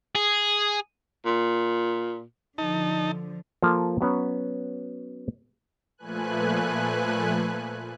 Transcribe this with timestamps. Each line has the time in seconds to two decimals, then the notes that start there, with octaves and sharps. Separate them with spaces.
0.15 G#4
1.26 A#2
2.58 D3 F3 D#4 A5
3.63 F3 A#3 F4 A4
4.01 F#3 B3 C#4
5.98 A#2 F3 A3 B4 G#5 F#6